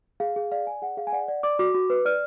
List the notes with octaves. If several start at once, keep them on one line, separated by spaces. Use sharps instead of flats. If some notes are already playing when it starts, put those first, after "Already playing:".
G#4 F5
G#4
D5 F5
D5 G#5
G#4 F#5
G#4 F5
G#5
D5 F#5
D5
D5 D6
F#4 D6
F#4
B4
D5 F6